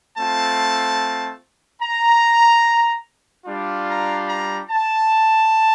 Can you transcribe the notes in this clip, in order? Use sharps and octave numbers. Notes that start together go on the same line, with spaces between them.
A3 C4 F4 A5
A#5
G3 D4 F4
A#5
A#5
A5